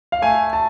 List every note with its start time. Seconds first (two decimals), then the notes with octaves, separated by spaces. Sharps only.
0.12 F5
0.22 A3 G#5
0.53 A5